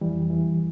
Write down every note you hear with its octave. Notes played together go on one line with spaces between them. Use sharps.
F2 E3 G3
E2 E3